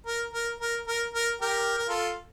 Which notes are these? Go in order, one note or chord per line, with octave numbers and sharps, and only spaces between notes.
A#4
A#4
A#4
A#4
A#4
G4 A#4
A#4
F4 A4